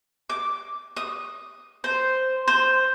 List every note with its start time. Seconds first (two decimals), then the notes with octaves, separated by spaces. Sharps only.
0.30 D6
0.97 D#6
1.84 C5
2.48 C5